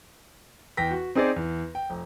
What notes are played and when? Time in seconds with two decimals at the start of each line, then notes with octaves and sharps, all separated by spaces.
0.77 E2 G5 A#6 B6
0.91 F#4
1.15 C4 D#4 G#4 C5 D5
1.36 E2
1.75 G5
1.90 F1